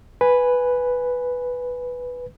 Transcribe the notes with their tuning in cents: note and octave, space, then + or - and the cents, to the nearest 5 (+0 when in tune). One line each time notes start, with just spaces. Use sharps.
B4 +0 G#5 +0